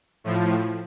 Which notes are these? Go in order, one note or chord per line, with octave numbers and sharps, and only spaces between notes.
A2 F3